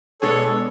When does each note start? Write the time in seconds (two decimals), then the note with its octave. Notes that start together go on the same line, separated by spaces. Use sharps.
0.22 B2 G#3 B3 D4 G#4 A4 C#5